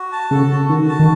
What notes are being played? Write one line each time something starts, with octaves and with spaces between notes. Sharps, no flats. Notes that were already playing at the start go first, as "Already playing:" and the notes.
Already playing: F#4
A5
C#3 A4
F#4
D#3 F#4
A5
D#3